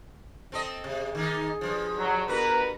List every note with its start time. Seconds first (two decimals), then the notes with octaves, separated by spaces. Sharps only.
0.52 C4 A4 D#5
0.84 C3 G#4
1.15 D#3 A#3 D#4
1.61 G2 E3 F3
1.98 F#3
2.28 G2 B3 F#4 A#4 B4